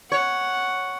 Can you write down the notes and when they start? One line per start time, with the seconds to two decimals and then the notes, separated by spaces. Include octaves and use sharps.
0.12 C#5 F#5